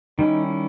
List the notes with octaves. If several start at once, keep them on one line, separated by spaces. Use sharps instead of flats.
D#3 G3 C#4 D#4 E4